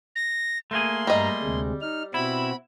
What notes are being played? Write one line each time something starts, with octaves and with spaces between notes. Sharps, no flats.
A#6
A3 A#3 G#4 C6
G2 G3 D#5 A#5
D2 C3 G#3
D#4 F6
B2 C4 E4 F#4 B5